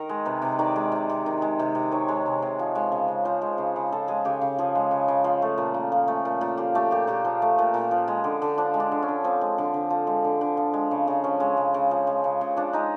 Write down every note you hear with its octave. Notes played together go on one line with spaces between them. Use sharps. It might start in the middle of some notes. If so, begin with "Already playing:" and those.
Already playing: D#3 A#4
G#3
C3 B4
C3
D#3 D5
G#3
C3
C3
D#3
G#3
C3
C3
D#3 C#5
G#3
C3
C3
F3
G#3
C#3
C#3
F3 C5
G#3
C#3
C#3
F3 A4
G#3 G#4
C#3 G4
C#3
F3 G#4
G#3
C#3
C#3
F3
A3
A#2
A#2
F3
A3
A#2
A#2
F3 G4
A3 G4
A#2 G4
A#2 G4
F3
A3
A#2
A#2
F3
G#3
D3
D3
F3 D4
G#3
D4
D3
C#4
D3
F3 C4
G#3
D3
D3
F3
G#3
D3
D3
F3
G#3
C#3
C#3
F3 C#4
G#3
C#3
C#3
F3
G#3
C#3
C#3
F3 D4
G#3 D#4